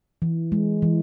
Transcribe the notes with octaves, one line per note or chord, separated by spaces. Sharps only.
E3
G#3
E3